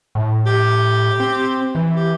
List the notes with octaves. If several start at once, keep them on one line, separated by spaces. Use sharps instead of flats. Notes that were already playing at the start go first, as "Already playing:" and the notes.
A2
G4
C4
E3
G4